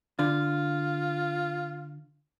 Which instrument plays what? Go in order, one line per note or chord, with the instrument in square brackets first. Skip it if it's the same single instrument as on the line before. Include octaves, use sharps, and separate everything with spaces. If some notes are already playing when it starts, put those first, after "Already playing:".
[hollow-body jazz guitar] D3 [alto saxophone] F4